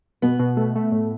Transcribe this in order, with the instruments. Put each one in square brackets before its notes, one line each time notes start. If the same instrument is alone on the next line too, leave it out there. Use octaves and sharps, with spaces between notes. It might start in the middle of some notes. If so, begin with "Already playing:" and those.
[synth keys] B2 [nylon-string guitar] B3
[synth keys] B2
A3
A3
A2